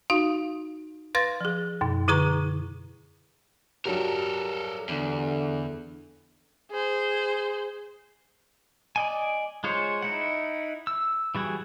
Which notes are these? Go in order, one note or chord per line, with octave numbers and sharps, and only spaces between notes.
D#4 F#4 F5
B4 F5 C6 A6 A#6
F3 G#4
F#2 B2
D3 E4 G#4 B4 A#5 C#6
G2 F#3 G3 A4 A#4
E2 D3
G#4 C5
D5 D#5 G#5
G#3 F4 G#4 C5 C#5
D#4 E4 F#5
E6
E3 G3 F#4 G#4